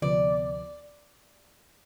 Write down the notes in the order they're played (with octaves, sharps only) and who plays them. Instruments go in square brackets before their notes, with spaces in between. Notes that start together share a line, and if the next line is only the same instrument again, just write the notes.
[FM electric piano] D2 C3 F3 B3 [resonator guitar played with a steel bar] D5